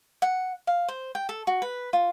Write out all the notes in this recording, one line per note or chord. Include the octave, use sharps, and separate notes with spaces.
F#5
F5
C5
G5
A4
F#4
B4
F4